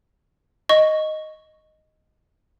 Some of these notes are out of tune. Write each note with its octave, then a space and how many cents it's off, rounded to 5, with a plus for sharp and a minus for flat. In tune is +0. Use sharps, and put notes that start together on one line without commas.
D#5 +0 C#6 +0